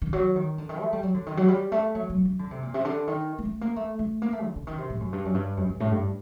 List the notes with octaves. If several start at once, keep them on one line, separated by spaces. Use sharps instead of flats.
D#3
F#3
D#3
D3
D#3
A3
G3
F#3
D3
D#3
F#3
G3
A3
F#3
F#3
F#3
D3
C3
A#2
C3
D3
D#3
A#3
A3
A#3
A3
A3
A#3
A3
D3
D3
D#3
C3
A2
F#2
G2
F#2
G2
F#2
G2
A2
G2